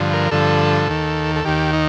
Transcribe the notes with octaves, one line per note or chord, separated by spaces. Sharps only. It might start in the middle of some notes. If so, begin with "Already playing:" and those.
Already playing: G2 D3 F3
A#4
G2 D3 F3 A4
D#2 D#3
A4
D#2 D#3 G4
D#4